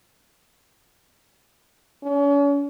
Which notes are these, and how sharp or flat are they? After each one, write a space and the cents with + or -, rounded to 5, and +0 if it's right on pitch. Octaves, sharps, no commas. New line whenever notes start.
C#4 +40